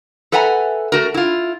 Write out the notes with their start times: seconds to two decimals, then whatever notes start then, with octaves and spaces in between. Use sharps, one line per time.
0.32 A4 B4 E5 F#5 G#5 A#5
0.92 A3 F#4 A#4
1.14 E4 F4